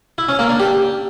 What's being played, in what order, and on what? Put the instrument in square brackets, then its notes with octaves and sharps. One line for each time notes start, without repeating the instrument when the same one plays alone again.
[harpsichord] E4
C#4
A#3
D4
G4